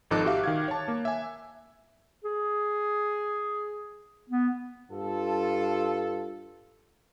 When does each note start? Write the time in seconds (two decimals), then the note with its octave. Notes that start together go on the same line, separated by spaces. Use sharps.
0.11 G#1 F3 D#4 A4 D6 F#6
0.25 F#4 G4 E5 F5
0.44 D#3 F5 G#6
0.68 C#5 A5
0.88 A#3
1.05 E5 G#5
2.24 G#4
4.29 B3
4.91 G2 F4 A4